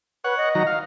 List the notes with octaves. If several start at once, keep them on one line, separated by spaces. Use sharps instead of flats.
B4 C#5 F#5
D#5
D#3 F#3 A#5
F5